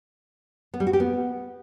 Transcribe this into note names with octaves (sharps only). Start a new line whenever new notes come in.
B3
G3
F#4
G4
B3